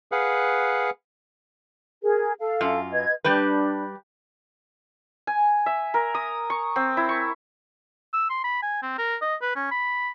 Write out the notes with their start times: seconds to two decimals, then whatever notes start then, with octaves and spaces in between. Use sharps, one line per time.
0.12 G#4 B4 F5 F#5
2.02 G#4 A#4
2.39 A4 F5
2.61 F#2 F4
2.92 B4 D#5 G#6
3.24 G3 D4 G4 B4
5.27 G#5
5.66 E5
5.94 A#4
6.15 D#6
6.50 C#6
6.76 C4
6.97 E4
7.09 C#6
8.13 E6
8.30 C6
8.44 B5
8.63 G#5
8.83 C4
8.98 A#4
9.22 D#5
9.42 B4
9.56 C#4
9.71 B5